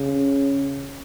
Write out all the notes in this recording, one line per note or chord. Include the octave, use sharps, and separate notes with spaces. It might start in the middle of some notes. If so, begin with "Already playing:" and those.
Already playing: C#3